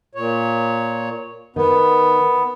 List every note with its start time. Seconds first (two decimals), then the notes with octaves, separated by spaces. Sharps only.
0.15 A#2 C#5
1.56 D#3 B3